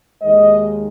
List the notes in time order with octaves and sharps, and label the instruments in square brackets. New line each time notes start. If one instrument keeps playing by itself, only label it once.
[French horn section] D#2 D#3 G#3 D#5